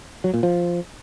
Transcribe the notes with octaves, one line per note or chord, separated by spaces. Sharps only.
F#3
A#2
F3